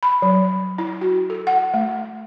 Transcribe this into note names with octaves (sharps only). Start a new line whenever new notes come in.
B5
F#3
E4
F#4
A4
F#5
A3